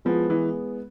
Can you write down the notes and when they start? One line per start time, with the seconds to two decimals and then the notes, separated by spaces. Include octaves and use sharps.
0.05 F3 G#3 B3 E4 G#4
0.30 E3